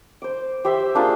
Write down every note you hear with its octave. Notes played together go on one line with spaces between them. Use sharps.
C5 D6
G4 C5 E5 G5
A#3 D4 F4 G#4